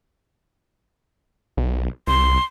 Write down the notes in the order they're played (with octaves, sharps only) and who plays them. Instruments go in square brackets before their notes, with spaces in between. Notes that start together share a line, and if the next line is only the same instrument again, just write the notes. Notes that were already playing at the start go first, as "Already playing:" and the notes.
[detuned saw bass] B1
[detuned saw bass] C2 [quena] C6